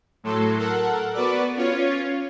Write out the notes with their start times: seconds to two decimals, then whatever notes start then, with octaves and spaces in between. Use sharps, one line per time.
0.23 A2 F#3 A4 C6
0.58 A4 A#4 F#5
1.13 B3 F#4 B4 D5 D6
1.56 C#4 F4 C#5